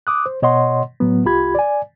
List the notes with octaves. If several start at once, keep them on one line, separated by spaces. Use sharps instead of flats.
D6 D#6 F#6
C5
B2 C#5 D#5 F#5 C6
A2 F#3 B3
C2 F4 G4 B5 G#6
D5 G#5